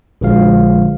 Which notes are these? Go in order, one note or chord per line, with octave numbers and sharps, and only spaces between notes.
A#1 D3 F3 G#3 F5